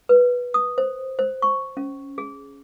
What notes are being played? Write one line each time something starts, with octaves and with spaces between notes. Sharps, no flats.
B4
D#6
C5
C5
C#6
C#4
G#4